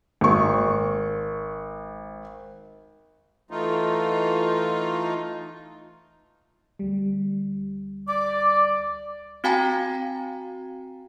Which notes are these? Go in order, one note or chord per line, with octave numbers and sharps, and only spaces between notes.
G#1 C#6
E3 A3 D#4 F4
D2 G3
D5 D6
C4 F#4 F5 G5 G#5 A#5